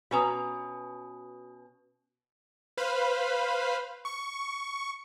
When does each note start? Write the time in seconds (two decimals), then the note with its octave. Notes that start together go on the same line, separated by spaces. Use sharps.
0.11 B2 C#4 F#4 B4 A#5 D#6
2.77 B4 C5 F5 B5
4.05 C#6